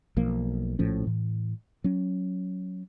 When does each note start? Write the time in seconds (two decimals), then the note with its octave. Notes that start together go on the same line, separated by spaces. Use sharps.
0.17 B1 F3 A#3
0.79 A#1 A2 F3 C#4
1.05 A2 E3
1.84 F#3 C#4